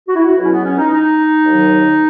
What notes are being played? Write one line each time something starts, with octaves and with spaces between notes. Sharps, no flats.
F#4
E4
F#4
C#2 B2 F#3 E4
C#4
B3
C#4
D#4
D#4
D#2 D#3 F#3